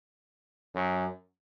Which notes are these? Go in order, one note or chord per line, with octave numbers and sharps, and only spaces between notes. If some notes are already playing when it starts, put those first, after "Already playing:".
F#2